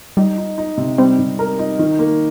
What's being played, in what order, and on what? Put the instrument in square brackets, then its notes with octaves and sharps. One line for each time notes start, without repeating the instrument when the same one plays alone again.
[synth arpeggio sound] G3 [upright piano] D#4
[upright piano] D#4
D#4
C3
[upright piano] G3 [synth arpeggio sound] C4
[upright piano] C3
A#4
D#4
D#3
A#3